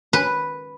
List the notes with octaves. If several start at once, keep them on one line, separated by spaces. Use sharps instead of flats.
B4